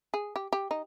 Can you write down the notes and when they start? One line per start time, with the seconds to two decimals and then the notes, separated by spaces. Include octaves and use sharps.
0.14 G#4
0.36 G4
0.53 G4
0.71 D#4